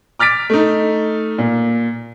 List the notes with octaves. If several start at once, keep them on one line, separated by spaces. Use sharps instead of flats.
D6 F6 A6 B6 D7
A3 D#4
A#2